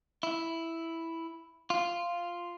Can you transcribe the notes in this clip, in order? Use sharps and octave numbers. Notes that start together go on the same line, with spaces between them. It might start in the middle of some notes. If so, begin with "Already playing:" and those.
E4
F4